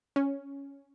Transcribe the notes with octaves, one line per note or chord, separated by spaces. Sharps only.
C#4